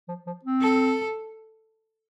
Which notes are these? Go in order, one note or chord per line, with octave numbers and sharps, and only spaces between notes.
F3
F3
C4
A4